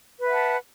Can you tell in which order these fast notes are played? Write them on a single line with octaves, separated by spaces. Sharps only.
B4 E5 F#5 A5